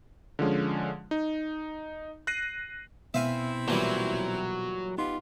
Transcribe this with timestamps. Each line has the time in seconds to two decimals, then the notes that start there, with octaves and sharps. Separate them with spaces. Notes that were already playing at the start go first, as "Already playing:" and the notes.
0.39 D3 F3 G#3 C#4
1.11 D#4
2.27 F#6 A#6 C7 D#7
3.14 B2 B3 C4 E4 E5 F5 G#5
3.68 A#2 E3 F#3 G3
4.98 B3 D#4 F4 G4 C6